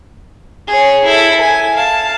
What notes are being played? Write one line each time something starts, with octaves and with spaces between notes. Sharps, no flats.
G#4 C#5
E4 A4
G#5
F5 A5